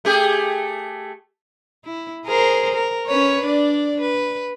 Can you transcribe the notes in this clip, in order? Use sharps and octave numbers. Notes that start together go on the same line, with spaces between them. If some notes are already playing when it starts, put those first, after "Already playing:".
A3 G4 G#4
E4
G#4 A#4 C5
A#4
C#4 B4 C#5
D4 D5
B4